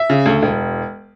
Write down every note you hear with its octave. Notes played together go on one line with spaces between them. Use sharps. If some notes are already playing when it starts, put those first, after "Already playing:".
Already playing: E5
C#3
D2
E1